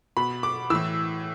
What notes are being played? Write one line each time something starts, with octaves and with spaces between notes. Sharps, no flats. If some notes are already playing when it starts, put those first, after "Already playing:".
B2 B5
D6
A2 E3 E6